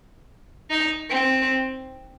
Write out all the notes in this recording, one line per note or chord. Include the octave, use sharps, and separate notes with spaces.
D#4
C4